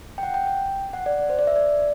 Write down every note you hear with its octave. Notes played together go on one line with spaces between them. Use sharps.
G5
F#5
G5
G5
F#5
D5
C5
D5
E5
D5